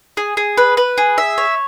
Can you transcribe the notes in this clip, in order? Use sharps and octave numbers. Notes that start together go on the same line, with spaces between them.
G#4
G#4
B4
B4
G#4
E5
C#5